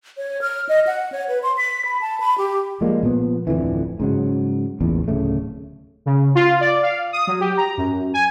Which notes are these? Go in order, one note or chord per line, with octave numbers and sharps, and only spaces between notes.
C#5
F6
D#5
F#5
C#5
B4
C6
B6
B5
A5
B5
G4
F3 G3 G#3 A#3
A#2 F3 B3
D1 F2 D3 E3
G#2 C#3 F#3
A1 E2 A#2
D1 C#3 A3
C#3
F4
D5
F5
D#6
F#3
G4
A#5
F#2
G#5